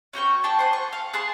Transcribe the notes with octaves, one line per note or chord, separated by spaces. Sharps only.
C#4 F#4 G5 C#6
D4 G5 A5
C5 F#5 G#5
C#6
F5
G#4 F#5 A5 C6